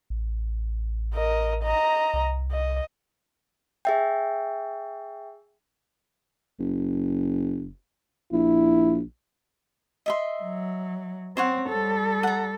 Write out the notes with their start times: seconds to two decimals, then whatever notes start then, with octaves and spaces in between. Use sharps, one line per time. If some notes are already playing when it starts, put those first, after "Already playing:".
0.10 A1
1.14 A#4 D#5
1.63 D#5 A#5
2.14 C2
2.52 D#5
3.85 G#4 E5 G5
6.59 F#1
8.32 A#1 E4
10.06 D#5 E5 C6
10.43 F#3
11.37 C4 C5 C#5 F#5
11.69 G3 A4
12.23 F#5 A#5